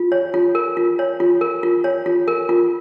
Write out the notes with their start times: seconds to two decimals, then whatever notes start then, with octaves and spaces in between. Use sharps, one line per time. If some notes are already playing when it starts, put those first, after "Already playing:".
Already playing: F4
0.12 C#5
0.34 F4
0.55 A#4
0.77 F4
0.99 C#5
1.20 F4
1.41 A#4
1.63 F4
1.84 C#5
2.06 F4
2.28 A#4
2.49 F4